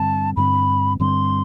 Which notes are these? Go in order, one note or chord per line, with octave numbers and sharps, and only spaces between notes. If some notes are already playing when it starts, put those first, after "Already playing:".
Already playing: G2 D3 G3 C4 A5
G2 D3 G3 C4 B5
G2 D3 G3 C4 C6